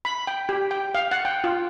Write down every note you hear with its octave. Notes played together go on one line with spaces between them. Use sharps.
B5
G5
G4
G5
F5
F#5
G5
F4